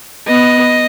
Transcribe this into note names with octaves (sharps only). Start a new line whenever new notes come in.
B3 D#5